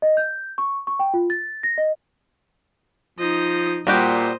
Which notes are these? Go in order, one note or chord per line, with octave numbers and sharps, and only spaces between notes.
D#5
G6
C#6
C#6
G5
F4
A6
A#6
D#5
F3 D#4 D#5
A#2 G3 F#4 G4 C5 D#5